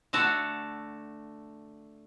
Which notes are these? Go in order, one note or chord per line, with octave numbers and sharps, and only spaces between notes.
D3 A3 F#4 A4